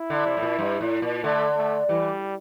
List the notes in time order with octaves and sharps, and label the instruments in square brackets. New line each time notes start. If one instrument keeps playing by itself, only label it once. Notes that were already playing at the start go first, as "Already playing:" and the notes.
Already playing: [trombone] E4
[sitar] D3
C3
A2
A#2
G2
A2
A#2
[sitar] D3 [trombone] A3
[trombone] A3
[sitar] E3 [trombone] G3